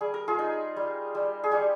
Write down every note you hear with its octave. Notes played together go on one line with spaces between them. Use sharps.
G3 G#4
A#4
F4 G#4
D#4
G3
G3
G#4
G3 G4